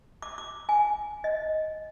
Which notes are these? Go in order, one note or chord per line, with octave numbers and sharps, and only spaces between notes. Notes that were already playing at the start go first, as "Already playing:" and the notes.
D6
D6
G#5
D#5